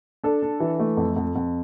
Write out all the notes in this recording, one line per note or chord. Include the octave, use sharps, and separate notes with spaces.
D4 A4
D4
E3
A3
F2
F2
F2